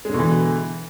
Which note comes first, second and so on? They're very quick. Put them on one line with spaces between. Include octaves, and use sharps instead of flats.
G#3 D3 B2 E3